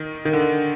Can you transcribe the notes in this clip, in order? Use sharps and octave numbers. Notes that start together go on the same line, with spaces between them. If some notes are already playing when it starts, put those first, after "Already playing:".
Already playing: D#3
D#3
D3